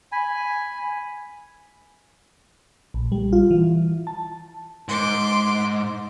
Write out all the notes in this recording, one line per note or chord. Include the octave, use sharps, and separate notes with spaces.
G#5 B5
A#1
G3
F4
E3
A5
G#2 C6 D6